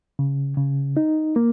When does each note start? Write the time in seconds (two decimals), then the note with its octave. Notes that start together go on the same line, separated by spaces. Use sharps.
0.19 C#3
0.57 C#3
0.97 D#4
1.36 A#3